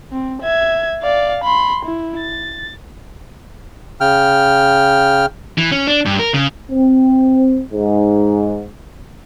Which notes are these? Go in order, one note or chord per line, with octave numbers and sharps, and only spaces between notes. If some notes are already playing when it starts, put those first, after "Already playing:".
C4
E5 G#6
D5 F5
B5 C6
E4
A6
C#3 G5 F6
E3
C#4
D4
G2
A#4
C#3
C4
G#2